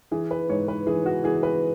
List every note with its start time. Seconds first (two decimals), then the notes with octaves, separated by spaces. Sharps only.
0.11 E3 G#4
0.31 B4
0.49 G#2 C#5
0.68 B4
0.87 E3 G#4
1.06 F#4
1.24 E3 G#4
1.43 B4